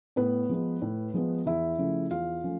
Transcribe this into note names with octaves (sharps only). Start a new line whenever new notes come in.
A2 B3 B4
F3 G#3 B3
A2
F3 G#3 B3
E2 E4 E5
C#3 F3 A3 C#4
E2 F4 F5
F3 A3 C#4